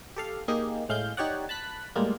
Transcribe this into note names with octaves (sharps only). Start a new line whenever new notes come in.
G4 A4 F5
A#3 D#4 G4 G#4
A2 G#3 F5 F6 G6
D#4 G4 C#5 D5 F#5
A5 B5 F#6 B6
A2 G3 G#3 A#3 F4